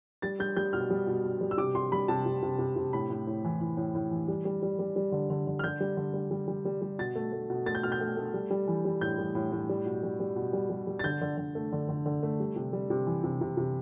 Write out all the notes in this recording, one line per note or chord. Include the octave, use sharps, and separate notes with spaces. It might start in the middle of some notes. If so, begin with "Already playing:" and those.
G3 A6
G3 G6
G3 G6
B2 F6
G3
B2
B2
G3
E6
C3 D6
C3 C6
G3 B5
C3 A5
C3
C3
C3
C3
A2 B5
A2
A2
E3
E3
A2
A2
E3
G3
G3
G3
G3
G3
D3
D3
D3
F6
D3 G6
G3
D3
G3
G3
G3
G3
G3
B2 A6
A3
A3
B2
A3 A6
G6
B2 F6
G6
A3
A3
G3
G3
E3
G3
A2 G6
G3
A2
A2
G3
B2
G3
G3
B2
G3
G3
G3
A6
D3 G6
D3
D3
A3
D3
D3
D3
A3
G3
C3
G3
C3
E3
C3
C3
C3